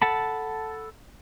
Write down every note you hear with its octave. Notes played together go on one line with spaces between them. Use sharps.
A4 F#5 A5 B5